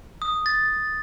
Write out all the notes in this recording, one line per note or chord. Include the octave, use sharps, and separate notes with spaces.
D#6
A6